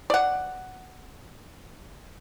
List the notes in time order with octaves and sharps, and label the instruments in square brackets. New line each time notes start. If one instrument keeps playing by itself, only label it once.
[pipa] D5 F#5